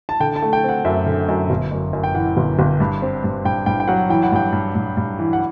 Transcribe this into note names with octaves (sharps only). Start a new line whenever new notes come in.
A5
D3 G5
A5
A3
G5
C4 F#5
F#2 E5
D3
F#2
G1
F#2
F#2
G5
E3 F#5
G1
G1
G2
C4
G2
G2 G5
G2 G5
G5
F#3 F#5
E3 G5
F#5
G2 G5
G2
G2
G2
E3
F#5